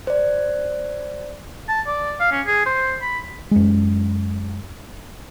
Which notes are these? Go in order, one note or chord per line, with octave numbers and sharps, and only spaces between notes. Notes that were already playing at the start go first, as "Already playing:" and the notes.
C5 D5
A5
D5
F5
C#4
G#4
C5
B5
F#2 G#3